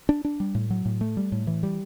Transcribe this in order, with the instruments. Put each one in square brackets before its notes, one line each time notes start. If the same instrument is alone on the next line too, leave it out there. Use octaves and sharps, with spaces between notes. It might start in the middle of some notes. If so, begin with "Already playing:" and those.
[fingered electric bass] D4
D4
G3
A2
F#3
A2
A3
G3
A2
E3
G3